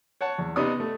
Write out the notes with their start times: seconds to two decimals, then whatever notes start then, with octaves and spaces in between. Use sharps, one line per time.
0.21 C#5 F#5 A5
0.38 E2
0.56 C3 B3 D#4 D5 D#6
0.80 A3